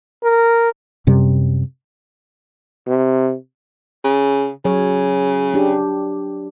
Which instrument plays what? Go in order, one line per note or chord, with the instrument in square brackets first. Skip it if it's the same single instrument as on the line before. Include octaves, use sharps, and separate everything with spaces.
[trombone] A#4
[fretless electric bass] F#2 C3 G3
[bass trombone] C3
[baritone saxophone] C#3
[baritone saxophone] C#3 [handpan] F#3 C#5
[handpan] D4 G4